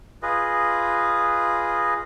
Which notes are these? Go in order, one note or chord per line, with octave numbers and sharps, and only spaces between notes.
F4 G#4 B4 D#5